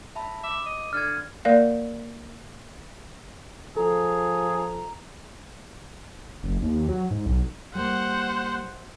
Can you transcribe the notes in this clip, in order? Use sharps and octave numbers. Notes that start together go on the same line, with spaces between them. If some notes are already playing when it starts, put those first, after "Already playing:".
E5 A5 B5
E5 D6
D#5
D3 F6 G#6
A#3 A#4 D5 F5
F3 G#4 A4 A#5
F#1
D#2
F#3
G#2
B1
G3 A#3 C5 F#5